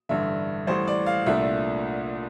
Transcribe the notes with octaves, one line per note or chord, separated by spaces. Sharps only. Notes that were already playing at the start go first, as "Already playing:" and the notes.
A1 G2 D3 E5
A1 A2 G3 C5
D5
F5
C2 A#2 A3 D4 E5